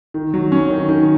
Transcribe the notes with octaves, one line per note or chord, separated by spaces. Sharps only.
D#3
F#3
C#4
D#3
D#3